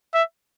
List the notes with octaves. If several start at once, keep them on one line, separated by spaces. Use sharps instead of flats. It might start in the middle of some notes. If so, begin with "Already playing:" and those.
E5